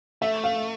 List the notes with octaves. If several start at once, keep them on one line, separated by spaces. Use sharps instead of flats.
A3 E5
F5